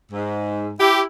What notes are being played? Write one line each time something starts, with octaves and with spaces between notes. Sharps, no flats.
G#2
E4 G4